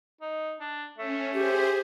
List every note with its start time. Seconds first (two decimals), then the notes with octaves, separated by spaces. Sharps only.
0.21 D#4
0.60 D4
0.98 A3 C#4
1.33 G4 G#4 C5